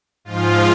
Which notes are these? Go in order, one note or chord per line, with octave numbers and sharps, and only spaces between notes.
G#2 F3 F4